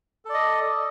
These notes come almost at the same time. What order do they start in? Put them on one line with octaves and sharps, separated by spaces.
A4 D5 D#5